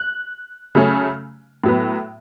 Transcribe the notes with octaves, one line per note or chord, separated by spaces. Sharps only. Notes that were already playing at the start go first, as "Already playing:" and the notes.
Already playing: F#6
C#3 F#3 A3 C#4
A2 F#3 B3